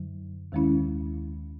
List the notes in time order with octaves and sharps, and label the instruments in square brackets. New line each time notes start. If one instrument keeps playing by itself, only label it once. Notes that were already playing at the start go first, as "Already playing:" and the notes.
Already playing: [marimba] F#2 D3 F#3
D#2 D#3 G#3 C#4 E4